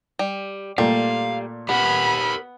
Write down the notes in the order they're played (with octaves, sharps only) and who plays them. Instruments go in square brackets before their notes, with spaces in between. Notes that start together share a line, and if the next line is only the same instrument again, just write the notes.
[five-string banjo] G3
[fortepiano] A#2 A3 [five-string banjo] G3 [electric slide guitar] F5
[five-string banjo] B3 [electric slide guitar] G4 A#4 F#5 [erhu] B5